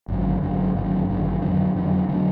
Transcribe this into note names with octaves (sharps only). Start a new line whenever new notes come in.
G#1 F#2 D3
G#1 F#2 D3
G#1 F#2 D3
G#1 F#2 D3
F2 D3 F#3 D4
F2 D3 F#3 D4
D3 F#3 D4